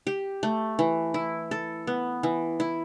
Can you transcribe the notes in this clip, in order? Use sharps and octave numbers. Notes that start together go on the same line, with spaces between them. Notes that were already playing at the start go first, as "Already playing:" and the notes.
G4
A3
E3
E4
A4
B3
E3
E4